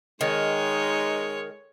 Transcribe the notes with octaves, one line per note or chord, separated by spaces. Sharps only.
D#3 G#3 D#4 C#5